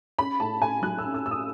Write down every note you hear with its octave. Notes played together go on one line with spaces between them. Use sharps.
C#4 B5
A2 A5
A2 G#5
F#3 F#6
E6
C#4
E6
A2 E6
D#6